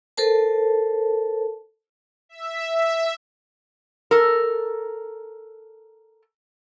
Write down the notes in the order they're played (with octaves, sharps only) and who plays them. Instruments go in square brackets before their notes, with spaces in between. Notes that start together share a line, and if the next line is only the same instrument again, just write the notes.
[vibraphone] A4 A#4 C5 A5
[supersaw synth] E5
E5
[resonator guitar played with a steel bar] A4 A#4